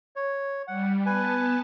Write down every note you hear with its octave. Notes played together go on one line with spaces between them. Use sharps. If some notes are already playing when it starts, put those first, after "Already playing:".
C#5
G3 F#5
B3 B4 G#5 A5